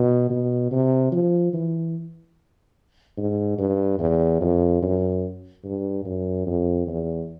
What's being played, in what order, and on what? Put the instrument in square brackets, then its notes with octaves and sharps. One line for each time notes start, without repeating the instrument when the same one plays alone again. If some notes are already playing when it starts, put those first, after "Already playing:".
Already playing: [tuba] B2
B2
C3
F3
E3
G#2
G2
E2
F2
F#2
G2
F#2
F2
E2